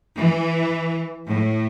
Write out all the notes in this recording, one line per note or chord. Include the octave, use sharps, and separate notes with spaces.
E3
A2